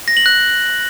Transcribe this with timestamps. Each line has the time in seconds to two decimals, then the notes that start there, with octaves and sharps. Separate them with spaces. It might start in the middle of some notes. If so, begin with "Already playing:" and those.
0.08 A#6
0.17 F#7
0.26 F#6